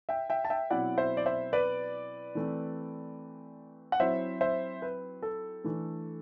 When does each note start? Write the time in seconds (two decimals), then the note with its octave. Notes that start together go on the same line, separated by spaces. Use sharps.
0.09 E5 G5
0.30 E5 G5
0.45 A5
0.50 E5 G5
0.70 B2 F#3 C4 E4 D5 F#5
0.98 C5 E5
1.17 D5
1.26 C5 E5
1.53 B4 D5
2.35 E3 A3 C4
3.92 F#5
4.00 F#3 C4 E4 C5 E5
4.41 C5 E5
4.82 B4
5.22 A4
5.64 E3 A3 D4